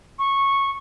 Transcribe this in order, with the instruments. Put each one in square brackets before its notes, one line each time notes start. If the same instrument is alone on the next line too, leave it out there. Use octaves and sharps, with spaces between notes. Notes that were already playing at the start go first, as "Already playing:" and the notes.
[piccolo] C#6